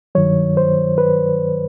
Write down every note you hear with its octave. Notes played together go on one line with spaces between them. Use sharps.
G2 D#3 F#3 C#5
C5
B4